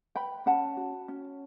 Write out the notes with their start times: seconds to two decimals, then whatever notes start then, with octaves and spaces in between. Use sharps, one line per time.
0.15 B4 G5 B5
0.46 C#4 F#5 A5
0.77 F#4
1.08 C#4